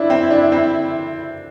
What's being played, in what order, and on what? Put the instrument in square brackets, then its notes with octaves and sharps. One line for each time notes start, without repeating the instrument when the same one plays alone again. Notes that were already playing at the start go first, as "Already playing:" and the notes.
Already playing: [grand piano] D4 [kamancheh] E4
[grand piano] C4
D4
C4